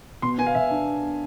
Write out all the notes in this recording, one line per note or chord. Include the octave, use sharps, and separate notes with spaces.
B2 C6
B3 G#5
F5
B2 E5
D4